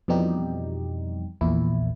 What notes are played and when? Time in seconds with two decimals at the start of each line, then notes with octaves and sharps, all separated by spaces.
0.08 F2 B2 E3 G3 D#4 G4
1.41 A#1 E2 A#2 E4